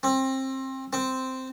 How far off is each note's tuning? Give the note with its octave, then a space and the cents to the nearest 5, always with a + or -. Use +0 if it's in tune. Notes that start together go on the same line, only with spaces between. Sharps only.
C4 +25
C4 -5